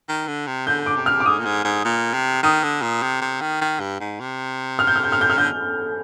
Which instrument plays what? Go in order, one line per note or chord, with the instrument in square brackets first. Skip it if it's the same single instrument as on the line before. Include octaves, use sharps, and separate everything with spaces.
[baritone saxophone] D#3
D3
C3
[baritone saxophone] D3 [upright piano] G6
[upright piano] D6
[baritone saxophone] C3
[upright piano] F6
D6
[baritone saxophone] G#2 [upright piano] D#6
[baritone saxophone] A#2
G#2
G#2
A#2
C3
[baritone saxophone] D#3 [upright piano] D#6
[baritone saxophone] D3
A#2
C3
C3
D#3
D#3
G2
G#2
C3
[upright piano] F6
G6
F6
G6
F6
G6
F6
[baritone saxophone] D3 [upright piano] G6